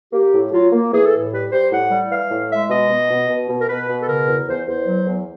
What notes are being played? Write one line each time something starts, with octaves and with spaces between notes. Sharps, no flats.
A#3 G4
A2
F#3 F4
A#3
E3 G#4
A4
A2
G3 B4
G3 C5
A2 F#5
G3
E3 F5
A2
G#3 E5
B2 D#5
B2
B2
B2
B2
A#4
B2 B4
B2
A4
C#3 A#4
E2
E2 C5
E2 C5
F#3
E2